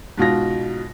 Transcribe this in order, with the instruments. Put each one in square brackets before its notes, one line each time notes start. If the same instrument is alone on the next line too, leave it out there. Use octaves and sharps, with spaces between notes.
[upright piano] G#2 B2 F4 A#6